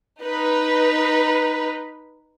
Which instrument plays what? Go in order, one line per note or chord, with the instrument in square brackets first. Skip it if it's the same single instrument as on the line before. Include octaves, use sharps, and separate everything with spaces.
[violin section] D#4 B4